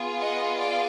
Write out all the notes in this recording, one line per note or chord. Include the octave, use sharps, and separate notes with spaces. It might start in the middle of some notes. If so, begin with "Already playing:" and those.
Already playing: B3 F4 G#4
D#5 F#5
D5 F5